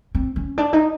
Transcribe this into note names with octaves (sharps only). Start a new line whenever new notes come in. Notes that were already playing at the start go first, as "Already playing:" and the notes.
C4
C#4
D4
D#4